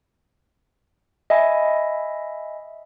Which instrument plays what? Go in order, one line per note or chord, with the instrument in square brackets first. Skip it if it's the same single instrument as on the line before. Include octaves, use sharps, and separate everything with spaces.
[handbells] D#5 E5 G#5 B5